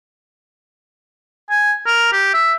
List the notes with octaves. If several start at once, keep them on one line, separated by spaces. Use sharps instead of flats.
G#5
A#4
G4
E5